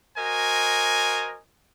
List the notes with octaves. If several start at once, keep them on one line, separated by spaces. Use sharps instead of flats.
F#4 A#4 C5 D#5 G#5